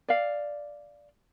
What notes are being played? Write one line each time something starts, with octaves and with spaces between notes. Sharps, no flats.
D5 F5